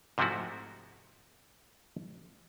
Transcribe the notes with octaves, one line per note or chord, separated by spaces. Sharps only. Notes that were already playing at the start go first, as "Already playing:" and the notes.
G#2 C3 F3 A3 E4 F#4